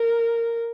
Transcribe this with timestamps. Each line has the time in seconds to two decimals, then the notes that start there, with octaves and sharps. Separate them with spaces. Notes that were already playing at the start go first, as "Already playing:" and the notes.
Already playing: A#4